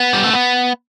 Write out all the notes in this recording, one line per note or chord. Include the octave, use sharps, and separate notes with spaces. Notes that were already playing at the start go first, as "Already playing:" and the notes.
Already playing: B3
G3
A3
B3